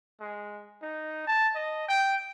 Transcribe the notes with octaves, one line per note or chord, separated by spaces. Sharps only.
G#3
D#4
A5
D#5
G5